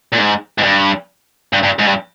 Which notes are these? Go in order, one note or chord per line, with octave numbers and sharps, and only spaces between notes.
A#2
G#2
G#2
G2
G2
G2
G#2
G2